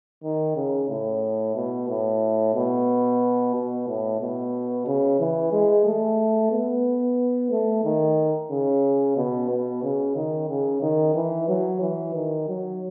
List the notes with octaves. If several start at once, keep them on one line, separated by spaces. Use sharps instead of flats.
D#3
C#3
A2
B2
A2
B2
B2
A2
B2
C#3
E3
G#3
A3
B3
A3
D#3
C#3
B2
B2
C#3
D#3
C#3
D#3
E3
F#3
E3
D#3
F#3